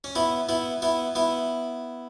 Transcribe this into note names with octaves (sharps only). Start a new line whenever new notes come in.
C#4
B3 E4
B3 E4
B3 E4
B3 E4